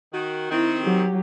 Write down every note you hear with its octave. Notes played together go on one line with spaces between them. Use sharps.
D#3 F#4
D#3 C4 E4
F#3 G4